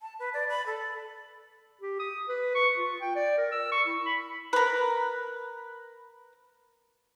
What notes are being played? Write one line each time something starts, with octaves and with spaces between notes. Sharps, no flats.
A5
B4
D5
B5
A4
G4
D#6
B4
C#6
F4
G5
D5
A#4
E6
C#6
E4
B5
A#4 B4